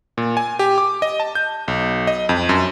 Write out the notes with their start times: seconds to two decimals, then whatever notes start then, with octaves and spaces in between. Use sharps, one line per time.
0.18 A#2
0.37 G#5
0.59 G4
0.78 D6
1.02 D#5
1.20 A5
1.35 G6
1.68 B1
2.07 D#5
2.29 F2
2.49 F#2